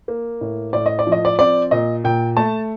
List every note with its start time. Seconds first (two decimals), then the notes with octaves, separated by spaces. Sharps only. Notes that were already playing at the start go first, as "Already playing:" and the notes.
0.08 A#3
0.41 A2
0.73 A2 D5
0.86 D#5
0.99 D5
1.07 F3
1.12 D#5
1.25 D5
1.39 C4 D5
1.71 A#2 D#5
2.04 A#2 G5
2.37 A3 A5